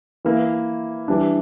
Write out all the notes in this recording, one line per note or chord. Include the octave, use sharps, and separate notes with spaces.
E3 A#3 E4
E3 G3 D4